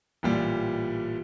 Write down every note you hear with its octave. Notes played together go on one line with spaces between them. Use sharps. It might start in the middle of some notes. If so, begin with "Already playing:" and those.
A1 A#2 G3